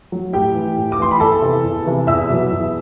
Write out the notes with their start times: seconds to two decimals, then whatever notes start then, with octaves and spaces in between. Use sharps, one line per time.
0.12 F#3
0.33 A2 G4 G5
0.55 E3
0.77 A2
0.92 D6
0.99 E3 C6
1.11 B5
1.20 E2 A4 A5
1.42 C3 E3
1.64 E2
1.86 C3 E3
2.07 E2 E5 E6
2.30 B2 F#3
2.52 E2